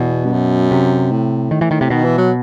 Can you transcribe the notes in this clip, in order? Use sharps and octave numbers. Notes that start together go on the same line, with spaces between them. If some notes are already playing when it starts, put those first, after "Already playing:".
Already playing: E2 B2
G2
F#2
C3
A2
D#3
E3
D#3
C3
B2 D#3
E3
F#3